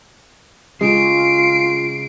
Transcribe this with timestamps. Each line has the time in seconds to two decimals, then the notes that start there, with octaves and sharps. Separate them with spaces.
0.81 C#3 G#3 F4 C7 D7